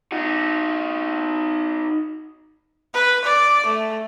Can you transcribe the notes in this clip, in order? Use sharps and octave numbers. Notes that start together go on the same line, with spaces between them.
D#4 F#4
B4
D5
A3